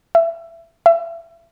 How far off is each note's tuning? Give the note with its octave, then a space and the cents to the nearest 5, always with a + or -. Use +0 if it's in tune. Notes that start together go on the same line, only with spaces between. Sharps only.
E5 +20
E5 +30